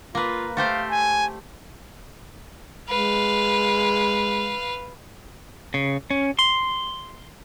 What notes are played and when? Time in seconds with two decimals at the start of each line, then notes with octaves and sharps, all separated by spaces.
0.15 A#3 F4 B4
0.57 A3 G4 C5 F5
0.90 G#5
2.88 G#3 B4 F5
5.74 C#3
6.10 C#4
6.39 C6